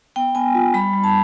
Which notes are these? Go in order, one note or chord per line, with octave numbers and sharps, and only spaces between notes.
B3 G5
B3 G#5
F4
G3 B5
G3
A5